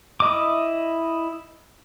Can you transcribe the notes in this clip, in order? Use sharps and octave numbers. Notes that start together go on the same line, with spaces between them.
E4 D#5 D6